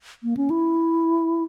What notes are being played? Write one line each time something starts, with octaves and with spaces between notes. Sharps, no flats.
A#3
C#4
E4